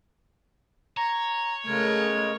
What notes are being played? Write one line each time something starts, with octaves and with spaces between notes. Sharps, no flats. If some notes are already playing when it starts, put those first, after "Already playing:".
C#5 A#5
C#3 G#3 A3 A#4 G#6